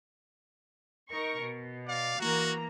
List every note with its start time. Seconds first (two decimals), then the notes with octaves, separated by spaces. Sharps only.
1.09 D#4 A#4 C#6
1.40 B2
1.88 D5 F5
2.20 E3 A#3 F#4 A#5